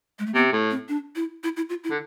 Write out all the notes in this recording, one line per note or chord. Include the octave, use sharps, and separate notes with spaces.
G#3
A3
C3 B3
A2
C4
D4
E4
E4
E4
F4
E4
D3